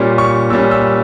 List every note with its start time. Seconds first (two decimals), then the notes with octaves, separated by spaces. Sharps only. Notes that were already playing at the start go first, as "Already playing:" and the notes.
Already playing: A#2 G3 C#4
0.18 C#6
0.50 A#2 G3 C#4 E6
0.71 E6